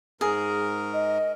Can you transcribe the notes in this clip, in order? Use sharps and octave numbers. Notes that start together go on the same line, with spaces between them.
G#2 G#4 A#4
D#5